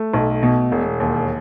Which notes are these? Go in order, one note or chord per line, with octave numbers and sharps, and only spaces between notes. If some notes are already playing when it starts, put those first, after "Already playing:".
Already playing: A3
B1
B2
E1
D#2